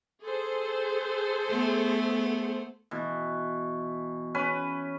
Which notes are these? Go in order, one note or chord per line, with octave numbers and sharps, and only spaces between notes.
G#4 A4 C5
A3 B3
B2 E3
C#4 B4